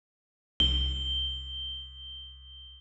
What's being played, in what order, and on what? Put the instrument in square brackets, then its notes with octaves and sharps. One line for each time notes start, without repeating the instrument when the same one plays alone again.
[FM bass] C2 [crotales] G7